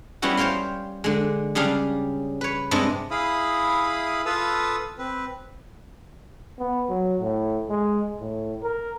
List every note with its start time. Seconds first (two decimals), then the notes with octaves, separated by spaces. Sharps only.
0.22 G3 B3 C#4 E4 F#4
0.37 C5 C#5 F5 G5 C6
1.04 D3 G#3
1.55 C#3 G3 D4 G#4 F5
2.41 B4 C#5
2.71 G2 C3 G#3 D4 D#5 A5
3.11 E4 G#4 F5 B5 D#6
4.25 F4 A4 B4 F5 D#6 E6
4.98 C4 B4
6.59 B3
6.89 F#3
7.20 A2
7.69 G#3
8.20 A2
8.63 A#4